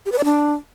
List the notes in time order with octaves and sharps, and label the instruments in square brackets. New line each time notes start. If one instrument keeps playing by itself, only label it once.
[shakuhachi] G4
B4
D5
D4